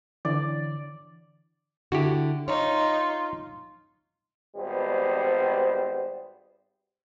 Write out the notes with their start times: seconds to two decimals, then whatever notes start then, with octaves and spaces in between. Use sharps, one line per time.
0.25 D3 E3 D5
1.92 D3 E4 F#4 G4
2.48 D#4 F4 C#5
4.56 G#1 G3 B3 C5